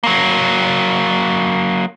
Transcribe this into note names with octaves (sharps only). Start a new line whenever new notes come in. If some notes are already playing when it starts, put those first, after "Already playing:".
F#3 A#3